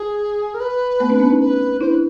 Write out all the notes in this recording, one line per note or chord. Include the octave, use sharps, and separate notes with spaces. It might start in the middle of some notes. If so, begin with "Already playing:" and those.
Already playing: G#4
A#4
B4
A3 B3
C4 D4
B3 C#4
C#4 D#4
B4
D4 E4 C5
B4